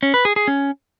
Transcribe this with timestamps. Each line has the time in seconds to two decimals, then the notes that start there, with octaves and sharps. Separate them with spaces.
0.03 C#4
0.14 B4
0.25 G#4
0.36 G#4
0.48 C#4